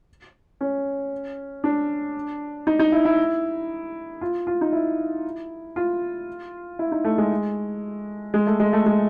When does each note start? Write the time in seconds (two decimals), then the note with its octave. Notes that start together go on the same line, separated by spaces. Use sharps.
0.61 C#4
1.64 D4
2.67 D#4
2.79 D#4
2.92 E4
3.05 E4
4.21 F4
4.47 F4
4.61 D#4
4.73 E4
5.76 F4
6.79 E4
6.92 D#4
7.05 A3
7.18 G#3
8.34 G#3
8.47 A3
8.60 G#3
8.73 A3
8.86 G#3